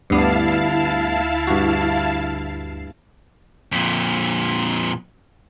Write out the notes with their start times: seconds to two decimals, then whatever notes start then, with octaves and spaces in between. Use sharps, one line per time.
0.10 D2 G2 B3 E4 D5 F5 A5 C7
1.47 G2 F#4
3.72 F2 A#2